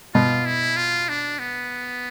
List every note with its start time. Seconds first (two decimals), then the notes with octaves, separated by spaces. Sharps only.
0.14 B2 F4
0.46 E4
0.77 F4
1.09 D4
1.39 B3